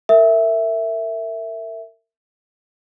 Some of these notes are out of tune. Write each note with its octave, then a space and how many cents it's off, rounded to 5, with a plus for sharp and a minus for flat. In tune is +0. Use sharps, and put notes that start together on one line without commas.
A#4 -30 E5 +0